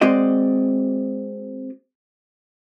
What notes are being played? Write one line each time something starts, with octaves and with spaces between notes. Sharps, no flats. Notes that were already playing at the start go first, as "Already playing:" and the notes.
G#3 C4 F#4 D5 D#5